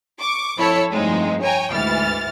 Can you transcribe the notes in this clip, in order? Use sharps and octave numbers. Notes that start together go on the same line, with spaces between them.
C#6 D6
F2 E4 A4 C#5 B5 C#7
G2 F3 G#3 A3 C4 D#4
C#5 G5 G#5 A#5
D2 G#2 E3 F6 A6